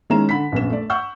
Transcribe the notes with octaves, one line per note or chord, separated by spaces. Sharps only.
D#3 G#3 C#4 E4 A#5 E7
D3 B5 B6
A#1 F#2 B3 E7
A3 D5
F#5 C#6 E6 G6